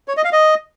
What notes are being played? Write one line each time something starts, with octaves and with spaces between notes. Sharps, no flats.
C#5
D#5
F5
D#5